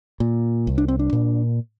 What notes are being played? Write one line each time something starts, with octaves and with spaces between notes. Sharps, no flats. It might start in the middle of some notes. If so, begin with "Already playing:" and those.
A#2
C2
D4
C4
D4
A#2